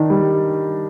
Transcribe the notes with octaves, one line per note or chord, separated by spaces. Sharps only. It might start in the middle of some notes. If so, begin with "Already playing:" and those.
Already playing: D#3 D4
G3